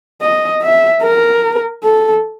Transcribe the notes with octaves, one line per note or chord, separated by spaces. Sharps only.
D#5
E5
A#4
A4